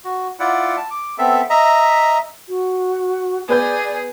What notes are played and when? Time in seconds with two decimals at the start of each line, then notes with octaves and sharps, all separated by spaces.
0.05 F#4
0.40 E4 F4 D5 F#5
0.77 A5
0.90 D6
1.18 B3 C4 A4 E5
1.50 D#5 E5 A#5
2.48 F#4
3.49 B3 G#4 B4 D5 G6